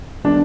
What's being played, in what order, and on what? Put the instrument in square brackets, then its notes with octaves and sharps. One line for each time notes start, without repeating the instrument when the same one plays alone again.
[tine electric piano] D#3 G3 B3 [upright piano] D4